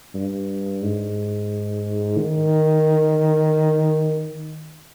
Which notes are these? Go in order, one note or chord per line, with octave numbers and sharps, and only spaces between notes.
G2
G#2
D#3